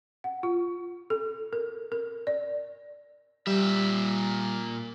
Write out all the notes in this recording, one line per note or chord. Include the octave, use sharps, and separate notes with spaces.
F#5
F4
A4
A#4
A#4
D5
A#2 G3 E5